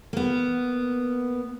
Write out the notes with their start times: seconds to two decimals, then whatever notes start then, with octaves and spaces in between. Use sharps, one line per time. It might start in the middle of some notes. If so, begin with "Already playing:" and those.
0.13 A#3 B3